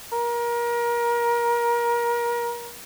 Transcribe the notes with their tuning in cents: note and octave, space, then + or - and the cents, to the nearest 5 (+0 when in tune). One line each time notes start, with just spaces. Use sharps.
A#4 +30